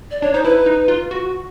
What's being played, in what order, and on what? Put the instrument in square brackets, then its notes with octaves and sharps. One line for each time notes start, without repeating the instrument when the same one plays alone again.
[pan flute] D5
[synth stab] D4 [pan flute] C#5
[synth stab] D#4 [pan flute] C5
[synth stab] E4 [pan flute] B4
[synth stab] D#4
F4
F#4